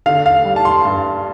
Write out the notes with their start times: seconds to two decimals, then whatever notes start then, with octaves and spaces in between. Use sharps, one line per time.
0.06 D3 F5
0.26 F5
0.45 G3
0.56 A5
0.65 C6
0.85 G2